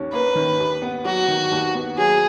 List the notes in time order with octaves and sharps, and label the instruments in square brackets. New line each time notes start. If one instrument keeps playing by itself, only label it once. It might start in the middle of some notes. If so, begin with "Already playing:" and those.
Already playing: [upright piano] D#2 D#3 C#4
[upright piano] A#3 [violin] B4
[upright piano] D#3
D#2
B3
[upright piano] F#3 [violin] F#4
[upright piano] D#3
D#2
B3
[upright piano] F#3 [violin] G#4